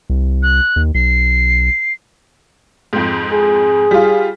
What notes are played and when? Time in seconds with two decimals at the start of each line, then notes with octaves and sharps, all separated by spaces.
0.10 C2
0.43 F#6
0.76 D#2
0.95 B1 C7
2.93 F2 G#2
3.33 G#4
3.91 G3 F4